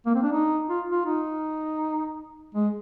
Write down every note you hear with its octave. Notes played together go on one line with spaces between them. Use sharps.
A#3
C4
D4
D#4
F4
F4
D#4
G#3